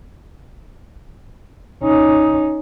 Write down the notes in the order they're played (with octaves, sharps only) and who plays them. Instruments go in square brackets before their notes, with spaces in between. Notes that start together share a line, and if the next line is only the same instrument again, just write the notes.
[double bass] C#4 D#4